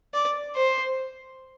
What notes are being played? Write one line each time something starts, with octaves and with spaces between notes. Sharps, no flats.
D5
C5